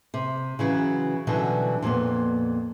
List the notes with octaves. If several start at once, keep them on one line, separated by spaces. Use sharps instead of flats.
C3
C#3 E3 F#3
B2 D3 E3 F#3 G3
F2 A#2 A#3 B3